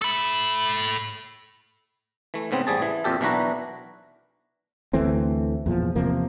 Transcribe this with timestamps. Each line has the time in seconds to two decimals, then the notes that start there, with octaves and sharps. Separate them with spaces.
0.02 A4 B5
2.34 E3 A3
2.51 G#2 C#3 B3 C4
2.67 A1 G3 G#4 A5
2.82 E3
3.04 F2 A#2 G4 A4
3.21 B1 E3 D4 F#4 B4 A#5
4.93 D2 E3 A3 C4
5.66 E2 A#2 F3
5.96 E2 C3 F3 A#3